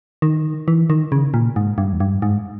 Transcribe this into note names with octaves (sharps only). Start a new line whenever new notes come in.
D#3
E3
D#3
C#3
A#2
G#2
G2
E2
G2
G#2